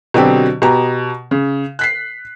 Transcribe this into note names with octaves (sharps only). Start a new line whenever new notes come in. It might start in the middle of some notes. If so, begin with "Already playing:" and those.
B2 D3 F#3 C4 G4
B2 G4 A#5
C#3
F#6 B6 C7